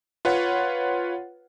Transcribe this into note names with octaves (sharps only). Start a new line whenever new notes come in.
F4 B4 C#5 F#5